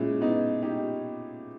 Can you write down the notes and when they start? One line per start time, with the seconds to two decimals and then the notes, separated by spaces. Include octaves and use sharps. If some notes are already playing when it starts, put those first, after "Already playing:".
Already playing: A#2 G#3 C#4 E4
0.21 B3 D#4
0.62 D#4 G4